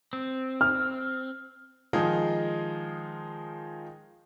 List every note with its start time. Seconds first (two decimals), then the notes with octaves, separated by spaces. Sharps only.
0.13 C4
0.61 F6
1.93 D#3 F3 G#3 D#4 F4 G#4